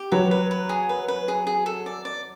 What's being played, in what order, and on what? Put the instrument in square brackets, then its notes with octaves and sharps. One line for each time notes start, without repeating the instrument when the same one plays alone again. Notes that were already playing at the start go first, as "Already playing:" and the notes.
Already playing: [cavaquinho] G4
[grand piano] F#3 [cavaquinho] B4
[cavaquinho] B4
B4
G#4
B4
B4
G#4
G#4
A4
D5
D5